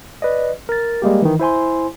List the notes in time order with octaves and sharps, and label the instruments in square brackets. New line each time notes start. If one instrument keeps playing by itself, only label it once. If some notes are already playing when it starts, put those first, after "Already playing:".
[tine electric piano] B4 D5 D#5
A#4 A6
G3 G#3 A#3 G4
D#3 E3
E4 C5 G#5 C6